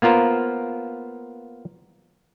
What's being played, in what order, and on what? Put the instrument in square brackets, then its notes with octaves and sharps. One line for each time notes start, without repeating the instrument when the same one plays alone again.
[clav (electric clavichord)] A#3 B3 F4 A#4 C5